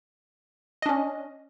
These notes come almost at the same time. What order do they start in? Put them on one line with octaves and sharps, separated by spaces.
D#5 D4 C#4